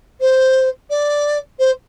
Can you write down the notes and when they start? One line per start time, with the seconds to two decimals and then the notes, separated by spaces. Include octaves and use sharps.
0.20 C5
0.90 D5
1.59 C5